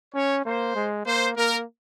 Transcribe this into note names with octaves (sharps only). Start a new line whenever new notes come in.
C#4 C#5
A#3 C5
G#3
A#3 C5
A#3 A#4